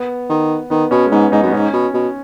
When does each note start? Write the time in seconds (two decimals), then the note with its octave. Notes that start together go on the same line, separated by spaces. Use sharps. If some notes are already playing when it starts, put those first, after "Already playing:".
Already playing: B3
0.30 D#3
0.70 D#3 B3
0.91 B2 C#4
1.06 G#3
1.12 G#2 B3
1.32 G#2 D#4
1.43 F#2 B3
1.52 G#2 C#4
1.73 B2
1.94 B2